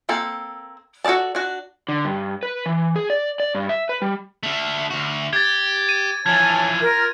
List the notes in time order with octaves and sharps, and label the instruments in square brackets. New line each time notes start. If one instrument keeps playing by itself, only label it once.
[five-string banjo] A#3 C4 A4
F#4 A4 A#4 D5 A5
D4 F#4
[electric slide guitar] D3
G2
B4
E3
G#4
D5
D5
G2
E5
B4
G3
[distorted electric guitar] D3 A3
D2 F#4
[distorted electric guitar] G4 [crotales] G#6 A6
[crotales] D#7
[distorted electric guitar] E3 F3 [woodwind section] C#5 G#5 A5 [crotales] G#6
[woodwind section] F4 A#4